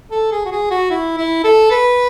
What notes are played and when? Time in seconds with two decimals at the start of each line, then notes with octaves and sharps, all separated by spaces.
0.11 A4
0.31 G#4
0.45 F#4
0.51 G#4
0.71 F#4
0.91 E4
1.17 E4
1.44 A4
1.71 B4